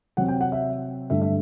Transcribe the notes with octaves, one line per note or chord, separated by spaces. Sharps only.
C3 F#3 C4 F#5
G5
F#5
E5
G2 D3 A3 D4 E5
E5